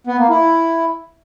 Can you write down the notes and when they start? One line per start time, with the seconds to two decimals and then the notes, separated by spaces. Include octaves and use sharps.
0.07 B3
0.18 A#3
0.30 E4